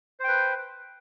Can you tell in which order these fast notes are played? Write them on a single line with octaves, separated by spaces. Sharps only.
C5 G5 B4